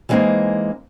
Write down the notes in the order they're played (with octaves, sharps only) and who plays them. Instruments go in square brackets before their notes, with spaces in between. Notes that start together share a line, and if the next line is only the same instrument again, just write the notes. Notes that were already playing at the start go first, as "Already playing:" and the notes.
[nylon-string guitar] E3 G3 G#3 A#3 C4 D#4